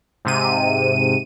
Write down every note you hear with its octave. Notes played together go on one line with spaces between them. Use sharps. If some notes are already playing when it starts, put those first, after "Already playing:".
G#2 C3 D#7